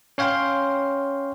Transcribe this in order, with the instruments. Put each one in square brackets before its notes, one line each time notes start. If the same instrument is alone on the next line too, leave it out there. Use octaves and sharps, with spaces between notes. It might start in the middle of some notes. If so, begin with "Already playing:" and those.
[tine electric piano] C#4 C#5 F5 G5 C6